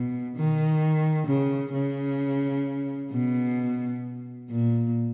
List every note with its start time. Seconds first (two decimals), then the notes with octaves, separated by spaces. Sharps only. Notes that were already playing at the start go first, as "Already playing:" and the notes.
Already playing: B2
0.36 D#3
1.27 C#3
1.73 C#3
3.11 B2
4.49 A#2